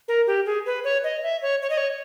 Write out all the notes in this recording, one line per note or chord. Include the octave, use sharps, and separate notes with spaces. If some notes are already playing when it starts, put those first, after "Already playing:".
A#4
G4
G#4
B4
C#5
D#5
E5
C#5
C#5
D#5
C#5